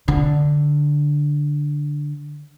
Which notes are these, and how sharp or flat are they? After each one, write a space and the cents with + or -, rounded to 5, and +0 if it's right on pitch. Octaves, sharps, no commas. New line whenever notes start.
D3 +0